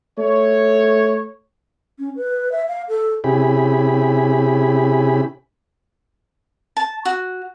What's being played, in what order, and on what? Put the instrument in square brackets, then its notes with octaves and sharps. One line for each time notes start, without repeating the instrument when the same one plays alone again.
[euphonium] A3 [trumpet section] C#5
[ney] C#4
B4
E5
F5
A4
[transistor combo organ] C3 C#4 E4 G4 G#4 B5
[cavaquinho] A5
F#4